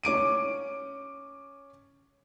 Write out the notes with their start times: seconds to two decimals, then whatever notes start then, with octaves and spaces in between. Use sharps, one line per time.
0.03 C#4 D6 D7 D#7